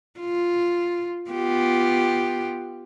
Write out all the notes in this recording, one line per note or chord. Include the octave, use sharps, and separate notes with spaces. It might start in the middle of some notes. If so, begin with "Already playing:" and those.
F4
B3 F4 G4